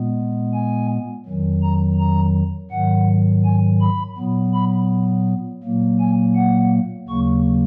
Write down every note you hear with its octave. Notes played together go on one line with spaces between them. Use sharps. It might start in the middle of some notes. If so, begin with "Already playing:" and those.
Already playing: A#2 G#3 B3
G#5
F2 D#3 F#3
A#5
A#5
G#2 D#3 F#3 F#5
G#5
B5
A#2 F#3 B3
B5
A#2 F#3 A#3
G#5
F#5
D#2 C#3 F#3 A#3 C#6